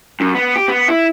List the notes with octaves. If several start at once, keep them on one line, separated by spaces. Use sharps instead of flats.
F#2
B3
G4
B3
E4